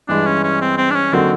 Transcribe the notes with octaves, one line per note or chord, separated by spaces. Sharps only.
G2 E3 G#3 D4
C#4
C#4
C4
C4
D4
C#4
D3 F#3 A#3 C4 D#4 F#4